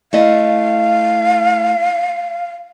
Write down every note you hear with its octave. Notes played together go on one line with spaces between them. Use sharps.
A3 E4 D#5 F5